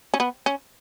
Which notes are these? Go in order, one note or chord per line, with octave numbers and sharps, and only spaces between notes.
C#4
B3
C#4